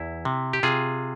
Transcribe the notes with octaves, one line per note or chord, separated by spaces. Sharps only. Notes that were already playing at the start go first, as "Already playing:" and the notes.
Already playing: E2 E4
C3
G4
C3 F4 G#4